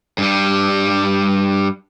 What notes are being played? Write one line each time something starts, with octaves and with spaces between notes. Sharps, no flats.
G2 G3